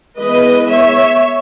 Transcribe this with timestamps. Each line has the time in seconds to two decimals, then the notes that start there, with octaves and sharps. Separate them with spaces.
0.18 E3 G#3 B3 B4 D#5
0.70 C#5 E5